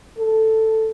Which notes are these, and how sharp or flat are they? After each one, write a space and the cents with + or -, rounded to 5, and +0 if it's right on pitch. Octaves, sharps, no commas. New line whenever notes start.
A4 +5